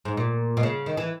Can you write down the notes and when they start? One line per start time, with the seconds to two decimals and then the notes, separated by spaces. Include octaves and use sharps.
0.05 G#2
0.17 A#2
0.57 B2
0.63 C#3
0.86 D#3
0.97 E3